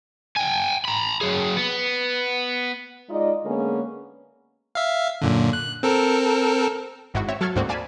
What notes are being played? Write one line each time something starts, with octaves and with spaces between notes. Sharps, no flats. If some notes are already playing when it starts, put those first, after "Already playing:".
G5 G#5
A#5 B5
F#3 G#4
B3
G#3 D#4 F4 D5 D#5
D3 G#3 A#3 B3 C#4 G#4
E5 F5
F#2 A#2 D3
F#6
C4 A4 A#4
G#1 G#2 E4 F#4 F#5
C4 C#5 E5
F#3 A4 C#6 F6 G#6
D2 G#2 A#3 C4 F#4
D5 F5 G#5 A5 B5